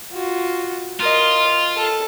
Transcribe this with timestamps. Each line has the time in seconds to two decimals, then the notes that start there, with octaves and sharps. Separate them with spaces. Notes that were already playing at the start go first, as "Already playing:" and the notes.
0.12 F4 F#4
1.00 F4 A#4 D#5
1.76 A4